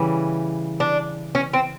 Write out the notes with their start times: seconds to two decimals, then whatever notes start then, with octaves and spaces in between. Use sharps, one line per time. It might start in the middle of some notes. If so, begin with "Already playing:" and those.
Already playing: C#3 E3 G3
0.80 D4
1.35 C#4
1.53 C4